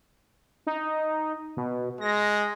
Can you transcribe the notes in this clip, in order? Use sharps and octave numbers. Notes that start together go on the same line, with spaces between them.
D#4
B2
G#3 A#6